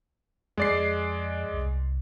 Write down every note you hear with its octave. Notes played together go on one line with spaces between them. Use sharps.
F2 G#3 D5 C7
C2